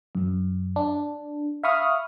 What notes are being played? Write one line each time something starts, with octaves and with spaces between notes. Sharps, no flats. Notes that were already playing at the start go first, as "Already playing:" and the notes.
F#2
D4
E5 F5 B5 C#6 D#6 F6